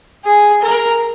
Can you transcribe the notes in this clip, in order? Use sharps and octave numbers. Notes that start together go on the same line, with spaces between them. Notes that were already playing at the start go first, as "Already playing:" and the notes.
G#4
A#4